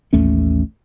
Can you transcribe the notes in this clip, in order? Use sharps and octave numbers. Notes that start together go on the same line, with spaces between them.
A1 D#2 A3 C#4